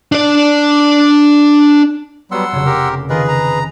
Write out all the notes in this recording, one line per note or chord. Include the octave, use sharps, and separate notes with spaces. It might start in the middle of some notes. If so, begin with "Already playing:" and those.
D4 D5
F#3 G3 B3 F#5 C6 E6
F1 C#3 F#3
G4 A#4
D#3 F4 G#4 A#4 B4 D#5
A#5